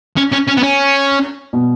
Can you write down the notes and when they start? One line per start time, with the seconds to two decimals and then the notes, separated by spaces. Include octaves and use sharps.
0.17 C#4
0.32 C#4
0.48 C#4
0.57 B3
0.63 C#4
1.53 B2